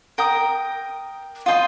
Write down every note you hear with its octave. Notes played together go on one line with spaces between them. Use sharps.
A#4 G5 D#6
F4 D#5 G5 C6